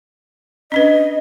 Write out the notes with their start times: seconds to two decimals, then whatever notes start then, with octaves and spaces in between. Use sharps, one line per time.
0.72 C#4 D4 B4 D#5